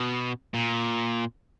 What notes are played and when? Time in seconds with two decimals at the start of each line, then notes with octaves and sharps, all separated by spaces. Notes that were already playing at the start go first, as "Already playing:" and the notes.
Already playing: B2
0.54 A#2